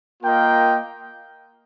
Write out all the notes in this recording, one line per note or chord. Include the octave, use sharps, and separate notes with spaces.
A#3 F4 A#4 D#5 G5